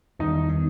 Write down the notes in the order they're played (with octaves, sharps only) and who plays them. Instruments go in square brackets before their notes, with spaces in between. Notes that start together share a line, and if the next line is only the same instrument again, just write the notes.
[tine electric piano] E2 D#3 G3 [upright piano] D#4
[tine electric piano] D#3 G3 B3 D#4